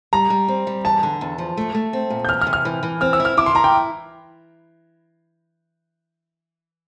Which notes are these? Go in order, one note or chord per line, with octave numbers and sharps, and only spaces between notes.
G3 A#5
G3
C4
G3
E2 A5
D3
E2
F3
A3
A3
C4
A#2
G6
E2 F6
F6
C3
F6
E3
E3
C4 F6
E6
E4
F6
E4 D6
C6
E4 A#5
G5